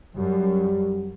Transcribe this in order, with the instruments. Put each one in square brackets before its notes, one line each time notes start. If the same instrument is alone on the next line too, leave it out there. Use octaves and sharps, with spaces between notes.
[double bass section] F#2 [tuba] G3